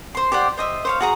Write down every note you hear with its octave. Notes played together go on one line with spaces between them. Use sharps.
C5 C6
G4 C5 D5 F#5
C5 D#5 E5
C5 C#5 F5
F#4 G#4 A#5